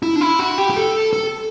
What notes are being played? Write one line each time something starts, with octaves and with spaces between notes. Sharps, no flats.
E4
D4
E4
F#4
G4
G4
A4
A4